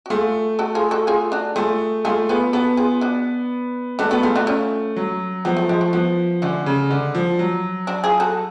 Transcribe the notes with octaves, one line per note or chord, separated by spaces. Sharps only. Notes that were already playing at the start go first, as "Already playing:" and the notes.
F#4
A3 F4 G#4
F#4 A4
F4 G#4
F#4 A4
F4 G#4
D4 F#4
A3 F4 G#4
A3 F4 G#4
B3 F4 G#4
B3 F#4 A4
F4 G#4
D4 F#4
A3 D4 F#4
B3 F#4 A4
A3 F4 G#4
A3 D4 F#4
C#4 F4
F#3
F3 B3
A3
F3 G#3
A3
F3 B3
D3 A3 C#4
C#3
D3
F3
F#3
D4 F#4
F4 G#4
F#4 A4